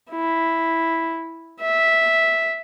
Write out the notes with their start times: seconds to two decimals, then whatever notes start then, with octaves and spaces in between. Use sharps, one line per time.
0.11 E4
1.60 E5